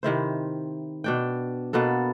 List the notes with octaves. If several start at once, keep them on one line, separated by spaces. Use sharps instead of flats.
C3 D#3 E4 C5
B2 D4 G5
B2 A#3 B3 A4